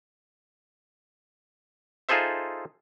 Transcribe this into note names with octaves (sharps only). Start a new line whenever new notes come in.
D#4 F4 G#4 A4 C5 E5